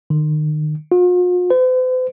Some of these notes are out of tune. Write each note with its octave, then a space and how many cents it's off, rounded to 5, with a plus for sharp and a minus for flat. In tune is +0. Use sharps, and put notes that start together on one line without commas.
D#3 -35
F4 +45
C5 -45